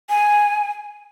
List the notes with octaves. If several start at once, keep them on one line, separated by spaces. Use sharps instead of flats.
G#5